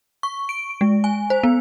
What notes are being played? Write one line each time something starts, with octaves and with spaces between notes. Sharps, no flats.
C#6
D7
G#3
G#5
C5
B3